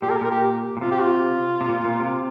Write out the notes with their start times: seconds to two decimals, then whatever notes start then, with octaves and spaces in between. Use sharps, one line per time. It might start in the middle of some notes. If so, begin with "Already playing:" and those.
0.02 A#2 G4
0.09 A#4
0.17 G4
0.21 A#2 A#4
0.30 G4
0.77 A#2
0.81 C3 F4
0.91 G4
1.02 F4
1.61 C3
1.69 A#2
1.84 A#2
2.00 C3